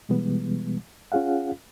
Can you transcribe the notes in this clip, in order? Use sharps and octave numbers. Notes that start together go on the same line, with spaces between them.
B2 E3 G3 G#3 B3
C#4 F4 G#4 F5 F#5